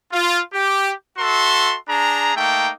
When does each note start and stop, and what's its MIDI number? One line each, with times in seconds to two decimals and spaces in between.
0.12 0.41 65
0.53 0.92 67
1.18 1.76 66
1.18 1.76 69
1.18 1.76 76
1.18 1.76 84
1.88 2.34 62
1.88 2.34 68
1.88 2.34 82
2.36 2.71 57
2.36 2.71 58
2.36 2.71 63
2.36 2.71 79